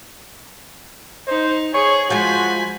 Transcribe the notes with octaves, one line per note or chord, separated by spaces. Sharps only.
D#4 C5
G#4 C#5 C#6
F3 G#3 F#4 G#5 B5